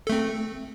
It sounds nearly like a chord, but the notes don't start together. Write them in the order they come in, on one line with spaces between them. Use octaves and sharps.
A4 A3 C4